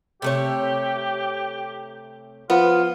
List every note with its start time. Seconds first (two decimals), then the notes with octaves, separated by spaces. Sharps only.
0.22 C3 A3 G4 C#5
2.50 F3 B3 F4